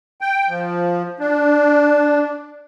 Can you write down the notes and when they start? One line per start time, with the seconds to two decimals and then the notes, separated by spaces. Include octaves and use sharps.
0.21 G5
0.49 F3
1.20 D4